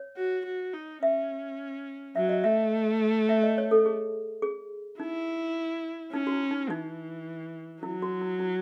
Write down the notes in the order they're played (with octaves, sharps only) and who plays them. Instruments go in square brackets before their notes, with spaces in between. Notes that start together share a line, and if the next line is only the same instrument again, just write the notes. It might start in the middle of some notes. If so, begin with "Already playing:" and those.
Already playing: [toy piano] C#5
[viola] F#4
F#4
D#4
[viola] C#4 [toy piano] E5
[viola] F#3 [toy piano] E5
[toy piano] D#5
[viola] A3 [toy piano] E5
[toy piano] E5
D#5
C#5
A4
G#4
G#4
[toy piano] D#4 [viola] E4
[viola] C#4 [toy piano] D#4
[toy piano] F#4
E4
D#4
[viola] E3 [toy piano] D#4
[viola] F#3 [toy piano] E4
[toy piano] F#4
E4
E4